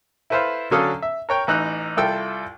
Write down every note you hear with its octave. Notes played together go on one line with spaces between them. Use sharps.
E4 A4 B4 C5 F5
D3 F#3 C#4 A4 F5 D#6
E5
A#4 C#5 G5
A1 E3 D#4 F#6
C2 E4 F4 A4 G5 E6